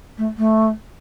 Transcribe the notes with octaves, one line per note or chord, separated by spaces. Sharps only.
A3
A3